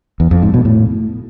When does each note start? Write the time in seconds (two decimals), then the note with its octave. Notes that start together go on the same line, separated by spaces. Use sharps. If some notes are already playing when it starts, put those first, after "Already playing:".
0.20 E2
0.31 F2
0.42 G#2
0.54 B2
0.65 A2